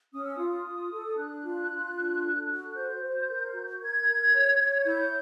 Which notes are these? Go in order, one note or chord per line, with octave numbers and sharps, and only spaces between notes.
C#4 D#6
E6
F4 D#6
F4
A4
D4 F#6
F4
F4
D4
A4
F#4
C5 G6
C5
A#4
F#4
A#4 G#6
A#4
C#5
C#5
E4 G6